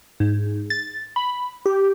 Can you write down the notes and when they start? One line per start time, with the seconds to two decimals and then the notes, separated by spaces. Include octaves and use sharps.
0.20 G#2
0.70 A6
1.16 B5
1.66 G4